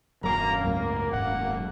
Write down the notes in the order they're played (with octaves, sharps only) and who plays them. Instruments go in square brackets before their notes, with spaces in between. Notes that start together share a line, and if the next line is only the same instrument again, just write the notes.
[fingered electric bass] D#1 F#3 [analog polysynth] F#2 A#3 [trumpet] A#5
[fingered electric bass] C#2 G#2 A3 [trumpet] A#4
[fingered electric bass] D#1 G#2 [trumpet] F#5